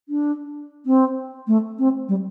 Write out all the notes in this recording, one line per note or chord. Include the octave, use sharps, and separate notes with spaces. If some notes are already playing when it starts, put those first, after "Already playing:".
D4
C4
A3
C4
G3